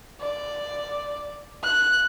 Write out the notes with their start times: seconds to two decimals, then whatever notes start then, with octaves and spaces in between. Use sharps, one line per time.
0.21 D5
1.63 F#6